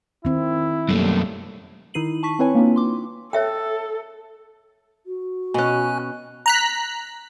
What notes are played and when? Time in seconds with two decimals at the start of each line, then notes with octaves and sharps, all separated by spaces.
0.25 D#3 C4 E4
0.89 F#2 G3 A3 A#3 A4
1.94 D#3 D#4 E4 C7 D#7 F#7
2.23 A5 C#6 B6
2.39 C4 E4 B4 C#5 G#5
2.55 A#3 C4 D4 D#4 F4
2.76 C6 D6
3.33 A4 C#5 E5 G5
5.05 F#4
5.54 B2 C#4 G#5 F#6
6.46 A#5 F#6 B6